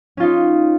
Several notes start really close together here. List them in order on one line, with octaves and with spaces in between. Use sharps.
C#4 F4 D#4